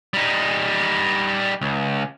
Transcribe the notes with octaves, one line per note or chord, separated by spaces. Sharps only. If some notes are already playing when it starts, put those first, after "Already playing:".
G3 D#4
C#2